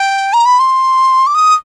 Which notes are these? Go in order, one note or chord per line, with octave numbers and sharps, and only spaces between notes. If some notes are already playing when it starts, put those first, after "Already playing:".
Already playing: G5
A#5
B5
C6
D6
D#6